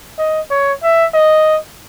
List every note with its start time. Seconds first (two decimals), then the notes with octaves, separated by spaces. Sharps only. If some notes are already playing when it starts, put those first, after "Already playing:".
0.19 D#5
0.50 C#5
0.83 E5
1.14 D#5